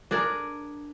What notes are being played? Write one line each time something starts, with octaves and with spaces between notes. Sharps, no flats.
D4 G#4 A#4